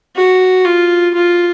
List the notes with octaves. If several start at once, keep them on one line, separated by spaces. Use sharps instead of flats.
F#4
F4
F4